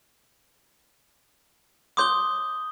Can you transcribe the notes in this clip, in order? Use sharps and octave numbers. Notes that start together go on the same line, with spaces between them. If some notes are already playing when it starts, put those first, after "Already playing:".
C#5 C6 D6 D#6 G6 G7